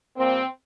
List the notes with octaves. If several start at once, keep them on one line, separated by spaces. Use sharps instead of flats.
A#2 G3 A#3 C4